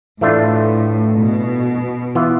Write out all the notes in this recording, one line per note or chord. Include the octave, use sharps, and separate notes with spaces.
A2 E3 A3 D4 F4
B2
E3 B3 F4